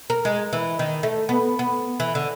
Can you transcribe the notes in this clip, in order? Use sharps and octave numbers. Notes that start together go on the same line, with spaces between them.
A#4
G#3
E3
D#3
A3
B3
B3
E3
D3